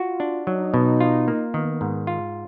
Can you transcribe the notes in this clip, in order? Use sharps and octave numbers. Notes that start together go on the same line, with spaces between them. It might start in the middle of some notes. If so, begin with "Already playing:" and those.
Already playing: F4 F#4
D4
F#3 D#4
B2
F4
A#3
D#3 B3
G#2
F4